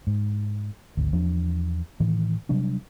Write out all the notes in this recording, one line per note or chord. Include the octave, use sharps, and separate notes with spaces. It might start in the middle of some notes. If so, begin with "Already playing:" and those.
G#2
G#1 D2
E2 F3 D4
A2 D#3 E3
C3 F#3 G3 D4